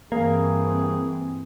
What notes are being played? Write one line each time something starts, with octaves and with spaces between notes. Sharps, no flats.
G2 E3 A#3 C4 G#4